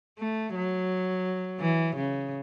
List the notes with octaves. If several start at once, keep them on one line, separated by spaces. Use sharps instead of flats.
A3
F#3
E3
C#3